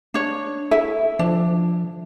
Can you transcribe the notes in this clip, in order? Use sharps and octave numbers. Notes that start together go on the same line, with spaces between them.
D4 C#5
E4 A4 E5
F3 D4